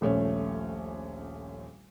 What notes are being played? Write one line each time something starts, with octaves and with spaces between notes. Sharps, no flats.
D#1 A#1 A3 C#4 C#5